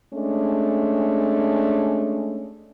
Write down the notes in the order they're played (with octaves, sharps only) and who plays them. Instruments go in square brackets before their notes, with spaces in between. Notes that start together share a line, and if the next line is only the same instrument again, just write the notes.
[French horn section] G#3 A3 C#4 D4